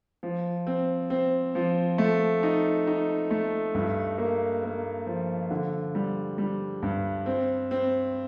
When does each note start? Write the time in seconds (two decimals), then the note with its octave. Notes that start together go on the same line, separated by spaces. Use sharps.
0.23 F3
0.67 C4
1.10 C4
1.55 F3
1.98 A3
2.43 D#4
2.87 D#4
3.31 A3
3.75 G2
4.18 A#3
4.63 A#3
5.07 F3
5.51 D3
5.95 G3
6.38 G3
6.83 G2
7.26 C4
7.71 C4